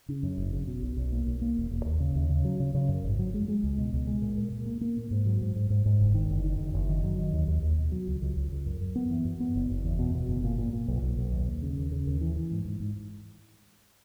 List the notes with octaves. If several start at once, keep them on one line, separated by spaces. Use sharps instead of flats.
C#3
F#2
F#1
C#3
B2
B1
B1
A#3
B1
A#3
E1
E1
D#2
C#3
D#2
C#3
F#3
C#3
C#3
F#2
G#1
F#3
G#3
G#3
C#2
B2
C#2
G#3
A#2
A#2
A#2
A#3
A#3
A#2
G#2
F#3
G#2
G#2
G#2
G#2
F#1
D#3
F#1
D#3
F#1
F#1
D#3
F#3
D#3
D#2
D#2
D#2
B2
F#3
C#2
C#2
C#2
C#2
F#2
F#2
B3
E3
F#2
B3
F#1
F#1
E2
B2
B2
F#1
A#2
A#2
A#2
B1
B1
B1
D#2
D#2
C#3
D#2
C#3
D#2
E3
E3
G#2
G#2
G#2